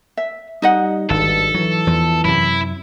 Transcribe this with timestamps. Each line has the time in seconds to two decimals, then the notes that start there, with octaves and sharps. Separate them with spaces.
0.17 E5
0.62 G3 D#4 D#5 F#5
1.10 G#1 G2 A4
1.54 E3 F#3
1.87 E2 F3
2.25 F#2 C3 E4